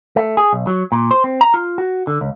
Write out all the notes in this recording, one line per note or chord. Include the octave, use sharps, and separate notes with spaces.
A3
G#4
B1
F#3
A#2
C5
C4
A#5
F4
F#4
D3
C#2